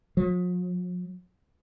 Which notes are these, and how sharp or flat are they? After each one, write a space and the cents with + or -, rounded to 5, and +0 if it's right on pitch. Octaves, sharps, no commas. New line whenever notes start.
F3 +45